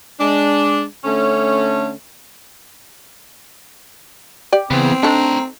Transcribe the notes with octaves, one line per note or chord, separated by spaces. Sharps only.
G#3 D4
D3 A3 C#4
G4 D5
C#3 E3 B3 C4
A3 D4 D#4 A4 A#5